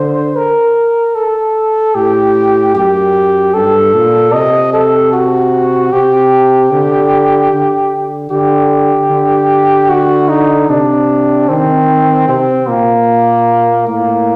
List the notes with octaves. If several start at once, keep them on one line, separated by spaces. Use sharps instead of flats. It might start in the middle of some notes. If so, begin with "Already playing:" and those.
Already playing: D3 C5
A#4
A4
A2 G4
F#2 G4
G2 A4
A#2
C3 D#5
A4
F#4
C3 G4
D3
D3
D3 G4
D3
F#4
D#4
C3 D4
D#3 C4
C3 C4
A#2 A#3
A2 A#3